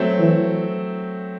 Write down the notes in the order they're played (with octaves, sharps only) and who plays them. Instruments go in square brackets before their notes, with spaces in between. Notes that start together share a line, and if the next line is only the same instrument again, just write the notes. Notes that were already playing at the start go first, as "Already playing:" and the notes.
Already playing: [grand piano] F#3 A3 C4
[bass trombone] E3